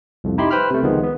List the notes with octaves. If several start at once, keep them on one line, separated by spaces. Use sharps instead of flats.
C2 F2
D#4 E4 G4 B5 C6
B4 C5 G5 B5 F6
C3 A3
C#2 D#3 F3 G#3 B3
B3